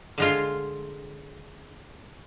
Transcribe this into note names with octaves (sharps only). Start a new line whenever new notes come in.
D3 G#3 F4